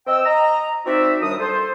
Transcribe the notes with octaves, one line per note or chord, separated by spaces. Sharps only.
C4 D#5 G5 E6
D#5 A#5
C4 D#4 F#4 D5 E5
D#2 G3 D4 D#6
A4 C5